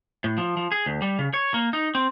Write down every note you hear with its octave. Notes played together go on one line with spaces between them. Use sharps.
A2
F3
F3
G#4
D2
G3
C#3
C#5
A#3
D#4
C4